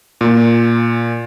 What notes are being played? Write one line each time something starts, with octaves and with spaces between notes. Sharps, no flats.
A#2